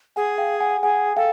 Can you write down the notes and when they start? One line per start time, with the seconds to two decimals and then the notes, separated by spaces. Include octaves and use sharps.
0.16 G#4 F#5 G#5
0.38 F5 G5
0.61 F#5 G#5
0.83 G#4 F#5 G#5
1.17 A4 F5 G5